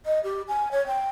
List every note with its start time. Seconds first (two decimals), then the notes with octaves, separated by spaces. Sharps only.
0.05 D#5
0.24 G4
0.48 G#5
0.72 C#5
0.87 G5